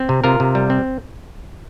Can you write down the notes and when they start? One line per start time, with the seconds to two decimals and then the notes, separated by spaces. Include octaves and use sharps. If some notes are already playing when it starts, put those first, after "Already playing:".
Already playing: C4
0.09 C3
0.24 C3 F4 A#4
0.40 C3
0.55 G3
0.70 C4